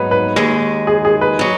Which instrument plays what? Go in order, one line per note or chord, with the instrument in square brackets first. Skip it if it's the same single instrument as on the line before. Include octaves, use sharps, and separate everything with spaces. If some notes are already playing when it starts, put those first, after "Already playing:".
Already playing: [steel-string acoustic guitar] G#2 F#3 B3 D#4 [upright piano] B4
[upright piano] B4
[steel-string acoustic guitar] D#2 D#3 G#3
[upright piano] G#4
G#4
B4
[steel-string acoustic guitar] F#3 D#4